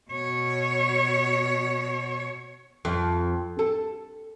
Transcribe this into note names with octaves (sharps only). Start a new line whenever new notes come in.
B2 C#5
F2
A4